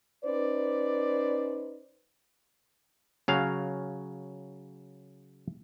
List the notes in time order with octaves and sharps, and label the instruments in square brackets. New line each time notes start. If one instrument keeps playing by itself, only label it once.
[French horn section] C#4 D#4 B4 C5 D5
[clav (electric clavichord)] C#3 F#3 F5